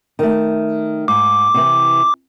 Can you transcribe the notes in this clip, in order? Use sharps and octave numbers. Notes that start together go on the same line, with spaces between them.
D#3 A3
G#2 D6
C3 E3